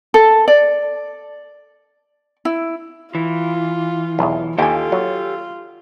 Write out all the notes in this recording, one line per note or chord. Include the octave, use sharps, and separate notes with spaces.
A4
D5
E4
E3 F4
B1 E2
D#2 F4 G4 A4 G5 G#5
F#3